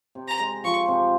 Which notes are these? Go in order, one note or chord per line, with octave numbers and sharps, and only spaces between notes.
C3
A#5
G#3
F3 C#6
C3